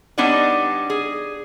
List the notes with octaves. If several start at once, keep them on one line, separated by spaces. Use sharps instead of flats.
G3 B3 D4 D#4 C#5 D5
G#4